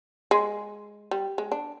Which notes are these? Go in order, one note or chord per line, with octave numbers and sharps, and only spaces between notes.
G#3
G3
G#3
D4